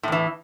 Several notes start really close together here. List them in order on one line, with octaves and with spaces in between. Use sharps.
A2 E2 E3